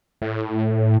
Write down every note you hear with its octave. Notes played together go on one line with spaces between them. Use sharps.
A2